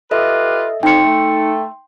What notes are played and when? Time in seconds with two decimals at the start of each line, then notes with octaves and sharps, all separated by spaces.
0.11 F4 G4 A4 B4 D#5 E5
0.83 F2 D#4 G5 C6 C#7
1.04 A3